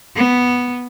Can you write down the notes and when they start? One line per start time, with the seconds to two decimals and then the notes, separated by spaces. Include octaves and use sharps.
0.16 B3